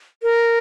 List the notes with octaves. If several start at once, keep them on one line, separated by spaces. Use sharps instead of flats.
A#4